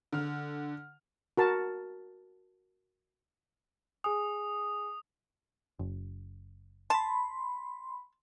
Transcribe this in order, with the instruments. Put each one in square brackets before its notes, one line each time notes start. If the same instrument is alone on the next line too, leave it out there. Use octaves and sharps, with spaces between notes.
[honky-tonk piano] D3 F6
[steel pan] F#4 A#4 A5
[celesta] G#4 G#5 [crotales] D#6
[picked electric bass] F#1
[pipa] A5 [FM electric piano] B5 C6